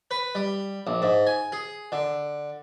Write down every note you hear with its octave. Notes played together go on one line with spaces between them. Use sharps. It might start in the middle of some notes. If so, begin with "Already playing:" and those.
B4
G3
A#1
G#2
G#5
G#4
D3